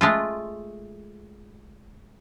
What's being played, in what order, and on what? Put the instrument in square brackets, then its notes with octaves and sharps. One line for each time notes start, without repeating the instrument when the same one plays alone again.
[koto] G#3 A3 F4